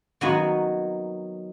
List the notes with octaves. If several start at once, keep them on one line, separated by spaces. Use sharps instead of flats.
D#3 F#3 B3 D#4 F#4